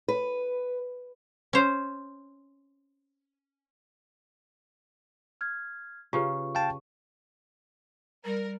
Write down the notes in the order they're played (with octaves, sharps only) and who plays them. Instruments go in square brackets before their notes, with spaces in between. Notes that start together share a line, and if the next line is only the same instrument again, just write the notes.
[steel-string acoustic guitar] B4
[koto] C#4 C5
[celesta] F6 G#6
[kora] C#3 [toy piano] F4 G4 B4 [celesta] C#6
[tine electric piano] F5 G5 A5
[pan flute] G3 [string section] A#4